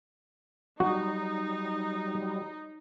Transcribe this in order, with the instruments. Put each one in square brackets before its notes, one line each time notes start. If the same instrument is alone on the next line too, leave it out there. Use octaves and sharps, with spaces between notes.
[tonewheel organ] F#3 G3 [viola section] D#4 [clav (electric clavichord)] F#4